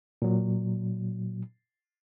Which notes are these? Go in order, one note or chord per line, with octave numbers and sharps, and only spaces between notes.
A#2 F#3